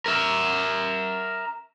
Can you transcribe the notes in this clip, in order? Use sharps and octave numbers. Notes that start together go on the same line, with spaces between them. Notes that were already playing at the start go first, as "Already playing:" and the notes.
A#4 E5